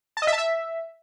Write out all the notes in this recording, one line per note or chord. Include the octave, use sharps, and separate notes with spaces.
A5
D#5
E5
A5
E5